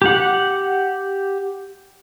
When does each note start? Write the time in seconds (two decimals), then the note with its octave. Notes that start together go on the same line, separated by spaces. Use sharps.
0.02 G4 F#5